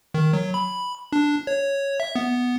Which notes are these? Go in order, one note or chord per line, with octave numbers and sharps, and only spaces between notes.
D#3
F#3
B5
D4
C#5
E5
B3